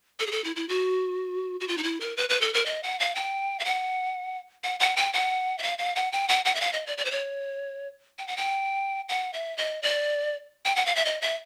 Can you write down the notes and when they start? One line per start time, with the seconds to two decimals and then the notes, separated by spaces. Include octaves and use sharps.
0.20 A4
0.27 G#4
0.32 A4
0.44 E4
0.56 E4
0.69 F#4
1.60 F#4
1.68 F4
1.78 D#4
1.83 E4
2.01 A#4
2.17 B4
2.29 B4
2.41 A4
2.54 A#4
2.66 D#5
2.83 F#5
3.00 F5
3.15 G5
3.60 F5
3.65 F#5
4.64 F#5
4.80 F#5
4.97 G5
5.13 F#5
5.59 E5
5.63 F5
5.78 F5
5.96 F#5
6.12 G5
6.29 F#5
6.45 F#5
6.55 E5
6.61 F5
6.73 D#5
6.87 D5
6.98 D5
7.05 C5
7.11 C#5
8.19 G5
8.28 F#5
8.37 G5
9.09 F#5
9.34 E5
9.58 D#5
9.83 D5
10.65 G5
10.76 F#5
10.86 F5
10.96 E5
11.05 D#5
11.22 E5